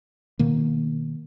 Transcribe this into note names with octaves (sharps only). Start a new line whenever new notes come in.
B2 D#3 A#3